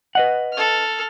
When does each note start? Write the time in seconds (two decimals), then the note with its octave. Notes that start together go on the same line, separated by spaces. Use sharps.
0.15 B4 D#5 F#5
0.53 A4 F6